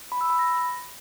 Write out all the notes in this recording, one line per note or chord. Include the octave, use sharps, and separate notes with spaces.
B5
E6
B5
A#6